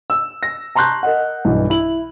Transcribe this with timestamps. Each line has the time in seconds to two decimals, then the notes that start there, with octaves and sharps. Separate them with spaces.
0.10 E6
0.43 A#6
0.75 A5 A#5 C6 C#6 F#6 G6
1.03 A#4 D#5 F#5
1.45 B1 G2 E3
1.70 E4 F#7